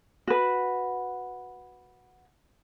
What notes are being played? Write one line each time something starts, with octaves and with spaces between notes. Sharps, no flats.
F#4 B4